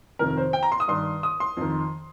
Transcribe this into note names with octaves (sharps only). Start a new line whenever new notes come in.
F2 C3 D#3 A#4
C5
G5
A#5
C6
D#6
G2 D#3 C6
D#6
C6
F2 D#3